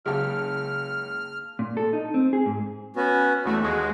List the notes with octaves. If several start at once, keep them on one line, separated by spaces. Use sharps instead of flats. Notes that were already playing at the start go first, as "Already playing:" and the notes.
F#1 C#2 G#4 F5 A5 F6
A#2
A4
D#4
C4
G#4
G#2
B3 C#4 F#4
E2 A3 F#4
D#2 G#3 F#4